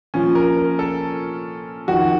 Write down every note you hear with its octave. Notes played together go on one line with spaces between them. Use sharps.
A#2 F3 C#4
A#4
A#4
A4
F2 D#3 F#4